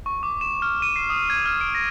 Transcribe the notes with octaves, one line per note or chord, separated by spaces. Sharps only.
C#6
D6
E7
F6
D#7
C7
D#6
G#6
F6
D7
A#6